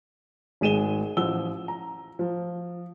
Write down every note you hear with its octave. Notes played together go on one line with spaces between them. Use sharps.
G#1 G#3 D#7 E7 G7
A1 F3 F#5 E6 G7
A#5
F3